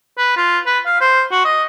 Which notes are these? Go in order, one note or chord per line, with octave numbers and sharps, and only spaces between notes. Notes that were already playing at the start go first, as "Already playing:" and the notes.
B4
F4
B4
F5
C5
F#4
D#5